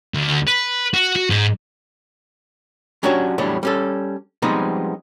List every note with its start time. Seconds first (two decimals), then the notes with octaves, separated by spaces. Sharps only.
0.14 D2
0.48 B4
0.94 F#4
1.16 F#4
1.30 G#2
3.03 F#3 C#4 D4 F#4 G4 C#5
3.38 E2 A2 F#3 G3 D4
3.63 G3 C#4 A4
4.42 F3 G3 G#3 B3 C4 D#4